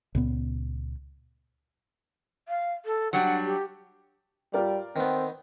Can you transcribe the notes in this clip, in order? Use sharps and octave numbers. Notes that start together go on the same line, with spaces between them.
C#2 A#2 B3
F5
A4
F#3 G3 D4 F#5
G4
G3 F4 A#4 D5
D#3 B3 C4